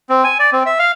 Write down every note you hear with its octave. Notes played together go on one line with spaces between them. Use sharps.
C4
G#5
D5
C4
E5
F5